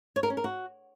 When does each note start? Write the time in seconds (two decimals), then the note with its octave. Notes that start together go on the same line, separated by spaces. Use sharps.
0.16 C#5
0.23 A#4
0.30 C#4
0.37 A#4
0.44 F#4